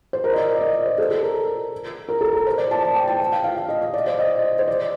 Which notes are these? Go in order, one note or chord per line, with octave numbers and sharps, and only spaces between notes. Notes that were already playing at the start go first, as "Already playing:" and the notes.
C5
A#4
D#5
D5
D5
D#5
C5
A4
A4
A#4
A#4
A4
A#4
C5
D5
A5
A5
G5
A5
G5
F5
F5
F5
D#5
D#5
D5
C5
D#5
C5
D5